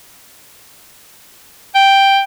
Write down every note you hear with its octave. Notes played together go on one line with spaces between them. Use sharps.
G5